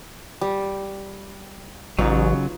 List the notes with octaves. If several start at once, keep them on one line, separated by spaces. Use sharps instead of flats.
G3
A1 C#3 F#3 D#4 F4